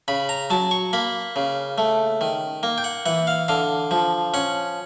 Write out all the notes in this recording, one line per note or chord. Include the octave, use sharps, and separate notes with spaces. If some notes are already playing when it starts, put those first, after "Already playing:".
C#3 B5
A#5
F#3 A5
C#6
A#3 B5
C#3
A3
D#3
A#3
G5
F#5
E3 F#5
F5
D3 F5
F3
C#4 F#5